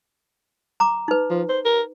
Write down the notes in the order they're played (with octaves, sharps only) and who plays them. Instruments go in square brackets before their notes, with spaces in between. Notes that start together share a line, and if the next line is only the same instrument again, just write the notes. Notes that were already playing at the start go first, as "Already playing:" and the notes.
[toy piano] A#5 D6
D#4 B4
[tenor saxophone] F3
C5
A#4